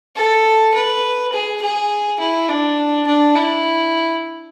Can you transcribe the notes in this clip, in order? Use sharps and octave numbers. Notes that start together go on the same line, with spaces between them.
A4
B4
G#4
G#4
E4
D4
D4
E4